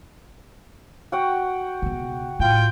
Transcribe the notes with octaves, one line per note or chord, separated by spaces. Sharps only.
F#4 F#5 G5
C#2 B2
A2 F4 G5